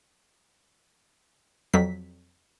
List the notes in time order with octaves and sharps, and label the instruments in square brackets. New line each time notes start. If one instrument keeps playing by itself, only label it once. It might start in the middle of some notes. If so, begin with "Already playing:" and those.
[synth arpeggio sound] F2 F#3 B6